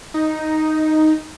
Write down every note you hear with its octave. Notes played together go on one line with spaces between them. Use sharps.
D#4